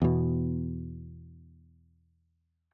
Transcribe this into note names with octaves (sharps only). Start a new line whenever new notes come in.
E2 B2